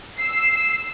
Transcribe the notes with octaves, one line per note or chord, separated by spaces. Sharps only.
E6 C7